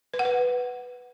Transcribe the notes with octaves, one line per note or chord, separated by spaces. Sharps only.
B4
F#5
B4